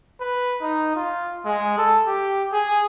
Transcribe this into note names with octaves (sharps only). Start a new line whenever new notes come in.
B4
D#4
F4
G#3
A4
G4
G#4